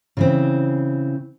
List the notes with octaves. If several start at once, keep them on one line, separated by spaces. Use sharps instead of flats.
C#3 E3 C4